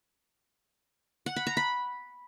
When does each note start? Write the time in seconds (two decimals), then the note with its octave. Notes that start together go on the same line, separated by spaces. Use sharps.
1.26 F#5
1.36 B5
1.47 A#5
1.57 B5